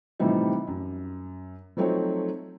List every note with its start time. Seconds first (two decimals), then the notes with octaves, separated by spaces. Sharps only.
0.20 A2 C3 E3 F3 G3 D#4
0.67 F#2
1.77 F3 F#3 A3 C4 D#4 C#5